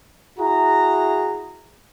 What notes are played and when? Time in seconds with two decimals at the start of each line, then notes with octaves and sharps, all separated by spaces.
0.39 E4 F#4 G#4 A#5